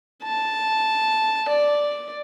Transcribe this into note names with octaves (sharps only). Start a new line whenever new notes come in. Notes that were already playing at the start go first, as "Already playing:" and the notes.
A5
D5